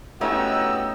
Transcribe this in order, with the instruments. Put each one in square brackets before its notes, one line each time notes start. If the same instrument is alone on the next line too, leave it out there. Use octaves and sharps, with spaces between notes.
[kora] A3 C#4 E4 [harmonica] B3 F#4 G4 [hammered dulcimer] D#4 [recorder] E6